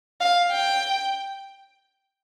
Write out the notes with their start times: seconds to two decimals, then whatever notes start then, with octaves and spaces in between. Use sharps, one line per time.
0.21 F5
0.52 G5